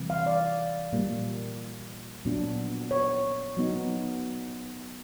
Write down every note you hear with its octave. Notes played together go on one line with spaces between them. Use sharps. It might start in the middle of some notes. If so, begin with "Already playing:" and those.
Already playing: C3 E3 G3
F5
D5
A#2 G3 A#3
A#2 F#3 B3 D4
C#5
F#3 B3 D#4